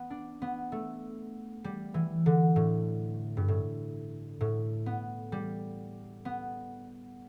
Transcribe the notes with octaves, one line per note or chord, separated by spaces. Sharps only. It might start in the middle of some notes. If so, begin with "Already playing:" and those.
Already playing: B3
D4
B3
A3
G3
E3
D3
A2
G2
A2
A2
B3
G3
B3